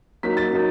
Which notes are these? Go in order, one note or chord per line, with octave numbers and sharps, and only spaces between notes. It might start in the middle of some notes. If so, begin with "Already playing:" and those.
F#3 A#3 D#4 B6
A6
F#3 A#3 D#4